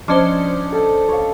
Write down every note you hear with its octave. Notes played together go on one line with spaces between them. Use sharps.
F3 C#4 D4 C5 D5 D#5
A4
C#5 F5